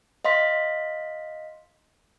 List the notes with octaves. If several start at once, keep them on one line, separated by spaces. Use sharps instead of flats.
D#5 F5 C6 B6